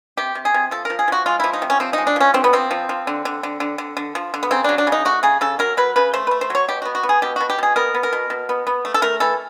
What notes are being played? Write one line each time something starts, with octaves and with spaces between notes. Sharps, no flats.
C3 G4
C3
G#4
C3
F3 A4
A#4
F3
G#4
F3 F#4
G#3 F4
F3 E4
D#4
C3
C#4
F3 C4
D#4
G#3
D4
F3 C#4
D3 C4
B3
F3 C4
F3
F3
D3
D3
D3
D3
D3
D3
F3
D3
B3
C#3 C4
F#3 D4
D4
C#3
D#4
A3 F#4
C#3 G#4
C#3 A4
F#3 A#4
F#3 B4
C#3 B4
A3 C5
A3 B4
C5
F#3 C#5
B2 G4
B3 F#4
F#4
B3
G#4
B2 G4
B2 F#4
G4
B2 G#4
B3 A#4
B3
A#4
B2
B2
B3
B3
A3
A4
A3 A#4
E3 A4